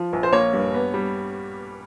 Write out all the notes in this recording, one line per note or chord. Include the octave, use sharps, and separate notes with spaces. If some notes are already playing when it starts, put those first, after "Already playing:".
Already playing: F3
A#1
C5
A#3 C#5
G2
B3
G3